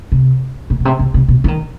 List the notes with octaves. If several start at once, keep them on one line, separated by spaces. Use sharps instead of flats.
C3
A#2
B2
C3
C3
C3
B2
E3
D#3